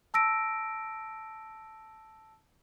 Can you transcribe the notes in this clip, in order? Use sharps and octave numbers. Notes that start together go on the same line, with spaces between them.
A5 E6 A#6 D7